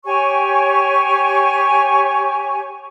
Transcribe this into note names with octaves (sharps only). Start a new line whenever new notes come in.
G4 C#5 G#5 C#6